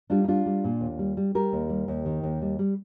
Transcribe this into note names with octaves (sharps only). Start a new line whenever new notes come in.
G3 D4 F4
D#4
G3 D4 F4
G3
A#2
D#2
G3
G3
G3 G4 A#4
D#2
G3
D#2
D#3
D#2
G3
G3